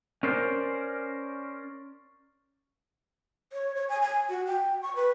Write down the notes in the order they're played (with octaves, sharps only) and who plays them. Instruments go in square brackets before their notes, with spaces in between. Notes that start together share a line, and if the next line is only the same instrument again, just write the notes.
[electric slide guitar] C#4 A#4 C5 D5
[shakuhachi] C#5
C#5
G#5
G#5
F#4
G5
C#6
B4